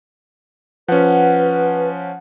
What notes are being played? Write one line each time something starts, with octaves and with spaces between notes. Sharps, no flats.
F3 C#4 B4 F#5